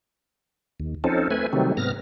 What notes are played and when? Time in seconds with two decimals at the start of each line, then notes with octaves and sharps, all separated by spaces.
0.80 D#2
1.04 F3 C4 C#4 D#4 A4
1.31 A3 C4 B4 G#5
1.53 C3 D#3 F#3 G3 A3 C4
1.77 G#2 C3 B3 F6 A#6